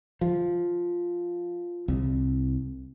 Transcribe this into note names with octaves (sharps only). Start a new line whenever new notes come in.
F3
C2